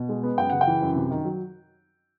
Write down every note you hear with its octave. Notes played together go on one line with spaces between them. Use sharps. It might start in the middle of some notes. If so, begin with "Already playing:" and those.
Already playing: B2
G#3
B3
F#2 G5
C#3 F#5
G5
E3
F#2
C3
D#3
F#3